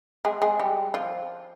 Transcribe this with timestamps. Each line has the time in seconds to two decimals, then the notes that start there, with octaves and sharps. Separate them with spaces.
0.25 G#3 G#4
0.42 G#3 G#4
0.59 G3 G4
0.94 F3 F4